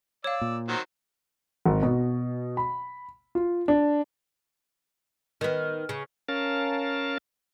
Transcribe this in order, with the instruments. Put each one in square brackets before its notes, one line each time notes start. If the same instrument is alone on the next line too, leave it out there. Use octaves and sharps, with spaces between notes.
[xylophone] C#5 F5 [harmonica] D5 E6
[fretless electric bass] A#2
[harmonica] D#3 F#3 C4
[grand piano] G#1
B2
B5
F4
D4
[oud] D#3 B3 [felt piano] B4 D#5
[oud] C#3
[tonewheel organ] C#4 A#4 F5 A5